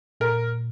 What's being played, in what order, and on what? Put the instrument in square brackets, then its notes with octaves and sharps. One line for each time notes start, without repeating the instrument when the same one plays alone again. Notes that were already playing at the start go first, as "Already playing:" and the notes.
[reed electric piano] A#2 [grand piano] A#4